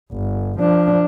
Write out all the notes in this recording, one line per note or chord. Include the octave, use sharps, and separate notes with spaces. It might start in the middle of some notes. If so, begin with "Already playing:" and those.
G1
F3 D4